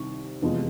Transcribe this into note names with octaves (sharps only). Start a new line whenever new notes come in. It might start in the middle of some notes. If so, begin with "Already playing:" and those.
Already playing: C2 C3 D#3 C#6
F1 E2 C3 F3 G#3